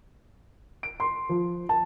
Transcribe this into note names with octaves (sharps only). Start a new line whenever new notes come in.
D7
C6
F3
A5